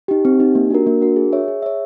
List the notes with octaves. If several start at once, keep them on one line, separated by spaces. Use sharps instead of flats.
D#4 G4
C4
D#4 G4
A#3
D4 F#4 A#4
A#3
D4 F#4 A#4
G#4
C#5 E5
G#4
C#5 E5